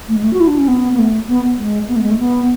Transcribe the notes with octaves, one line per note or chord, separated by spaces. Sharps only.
A3
G#3
A3
F#4
E4
D4
C#4
B3
B3
A3
B3
G#3
B3
A3
G#3
A3
B3